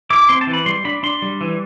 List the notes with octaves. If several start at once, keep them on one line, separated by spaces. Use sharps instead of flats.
E4 D6
C4 C6
A5
E3
B5
G3 C6
D4 B5
D4 C6
G3
E3